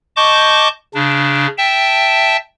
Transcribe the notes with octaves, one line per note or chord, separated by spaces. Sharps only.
D#5 A5 C#6 D6 G6
C#3 D4
E5 G5 A5